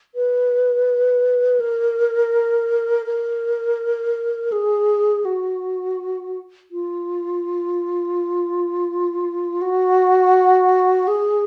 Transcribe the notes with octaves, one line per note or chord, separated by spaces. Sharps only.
B4
A#4
A#4
G#4
F#4
F4
F#4
G#4